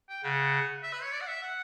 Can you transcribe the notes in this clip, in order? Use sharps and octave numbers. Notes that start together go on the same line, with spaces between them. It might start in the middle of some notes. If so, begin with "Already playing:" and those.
G5
C#3 F#5
E5
B4
C#5
D5
F#5
E5
F#5